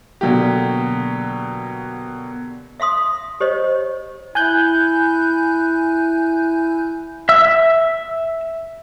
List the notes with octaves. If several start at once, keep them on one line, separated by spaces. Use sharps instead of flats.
B2 D3 F#3 A#3 G4
E5 F5 C6 D#6
G4 C5 C#5 D#5
E4 G#5 F#6 G6
E5 E6